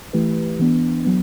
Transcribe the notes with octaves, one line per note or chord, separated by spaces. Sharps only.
E3 A3 E4 G4 B4
E3 B3 D4
F#3 B3